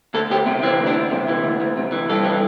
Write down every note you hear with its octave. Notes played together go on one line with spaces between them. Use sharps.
D2 A4
D2 G4
C3
E3 C4
D2
D4
D2
C3
E3
D2
D2
C3
E3
G2 A4
E3